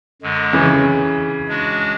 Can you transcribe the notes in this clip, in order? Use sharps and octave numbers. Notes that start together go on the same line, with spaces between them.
F#2 D3 G#3
C#3 E3
G#3 D4 F#4